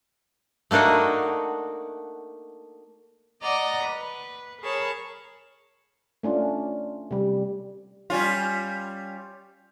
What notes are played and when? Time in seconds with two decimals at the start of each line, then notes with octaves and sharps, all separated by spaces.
0.71 A3 A#3 D4 D#4 F#4
3.42 D5 D#5 F#5 A#5
3.85 B4
4.62 G#4 A#4 C#5 A5 B5
6.23 A3 C#4 D4 F4
7.11 C3 G3
8.10 G3 C#4 F4